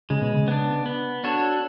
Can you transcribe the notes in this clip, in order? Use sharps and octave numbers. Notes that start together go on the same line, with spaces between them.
C#3 G#3
B2
C#3
B3 D4
B3
D4 F#4 A4 C#5